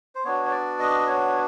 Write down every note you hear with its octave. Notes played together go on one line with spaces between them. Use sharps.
C5
B3 D4 F#4 C#5
C#5
D5
D#5
C#5